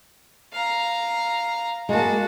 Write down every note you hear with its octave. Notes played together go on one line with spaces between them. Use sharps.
F5 A#5
G#3 A#3 F#4 A5